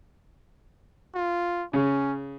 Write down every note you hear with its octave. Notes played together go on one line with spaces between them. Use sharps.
F4
C#3 C#4